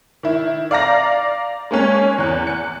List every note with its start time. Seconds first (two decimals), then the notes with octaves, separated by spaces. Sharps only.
0.23 D#3 E4
0.71 D5 F5 A#5 A#6
1.71 G#3 A#3 C#4
2.18 E2 F#6
2.47 F#6 C#7